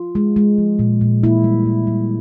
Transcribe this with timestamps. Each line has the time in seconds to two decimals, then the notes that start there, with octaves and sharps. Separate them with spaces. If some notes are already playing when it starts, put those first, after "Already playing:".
Already playing: F4
0.15 G#3
0.36 G#3
0.58 F3
0.79 A#2
1.01 A#2
1.23 A#3 E4
1.44 G3
1.66 A#2
1.87 G3